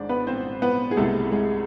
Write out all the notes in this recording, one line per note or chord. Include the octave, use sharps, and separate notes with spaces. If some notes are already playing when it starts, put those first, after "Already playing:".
Already playing: G#1 G#2 G#3 D4 C5 D5
B3 B4
C4 C5
B3 B4
G#4
C2 C3 G#3 A3 B3 A4
G#3 G#4